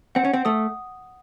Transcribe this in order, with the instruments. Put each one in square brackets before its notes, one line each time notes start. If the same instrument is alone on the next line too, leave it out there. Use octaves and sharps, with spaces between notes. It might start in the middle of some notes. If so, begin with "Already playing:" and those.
[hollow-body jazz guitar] C4 [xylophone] F#5
[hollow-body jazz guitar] C#4
C4
[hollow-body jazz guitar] A3 [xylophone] D#6